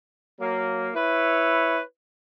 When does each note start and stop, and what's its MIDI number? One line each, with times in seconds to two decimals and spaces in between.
0.41 0.90 54
0.41 0.90 58
0.96 1.81 64
0.96 1.81 71
0.96 1.81 73